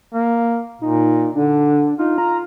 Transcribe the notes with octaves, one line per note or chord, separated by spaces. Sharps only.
A#3
A#2 D#4
D3 D4
D#4 F4
A#5